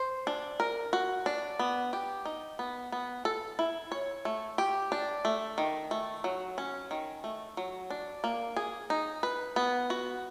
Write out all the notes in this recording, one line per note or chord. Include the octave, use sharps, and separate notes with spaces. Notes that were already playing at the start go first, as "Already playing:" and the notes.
Already playing: C5
D4
A#4
F#4
D4
B3
G4
D#4
B3
B3
A4
E4
C#5
A3
G4
D4
A3
D#3
A3
F#3
C#4
D#3
A3
F#3
D4
A#3
G#4
D#4
B4
B3
F#4